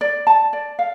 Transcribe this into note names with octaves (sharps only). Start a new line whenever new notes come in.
D5
A5
D5
F5